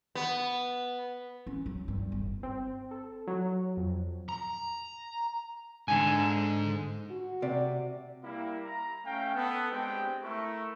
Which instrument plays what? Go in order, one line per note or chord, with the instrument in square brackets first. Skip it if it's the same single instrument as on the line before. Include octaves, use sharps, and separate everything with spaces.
[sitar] B3
[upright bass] C#4
F#3
G2
G1
[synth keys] C4
A4
F#3
F2
[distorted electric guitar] A#5
[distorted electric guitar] G#2 D#4 [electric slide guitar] D3 G#5
[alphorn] F#4
[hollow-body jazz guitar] C3 [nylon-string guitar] D5
[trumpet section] G3 A#3 E4
A#5
A3 C#4 F5 G5
B3 A4
G#3 C4 D4 G4 C5 G5
A3 E4 A#4 C#6